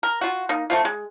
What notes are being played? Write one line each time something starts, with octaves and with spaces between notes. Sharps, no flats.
A#4
F4 F#4
A#3 D#4
A3 C4 F4
G#3